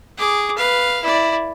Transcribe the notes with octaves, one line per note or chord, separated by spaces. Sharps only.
G#4 D6
B4 F5
E4 D5